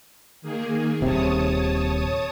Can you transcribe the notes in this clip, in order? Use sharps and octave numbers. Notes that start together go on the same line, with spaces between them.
D#3 A#3 G#4
D#1 C3 C#5 A5 D#6